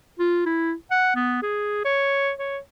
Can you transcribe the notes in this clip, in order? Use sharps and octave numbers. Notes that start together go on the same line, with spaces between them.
F4
E4
F#5
B3
G#4
C#5
C#5